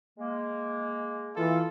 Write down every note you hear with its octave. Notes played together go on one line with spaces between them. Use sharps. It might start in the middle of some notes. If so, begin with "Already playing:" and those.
G#3 A#3
E3 F4 A4